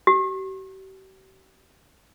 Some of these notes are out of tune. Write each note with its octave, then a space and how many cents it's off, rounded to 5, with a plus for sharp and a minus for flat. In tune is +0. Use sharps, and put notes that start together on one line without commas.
G4 -45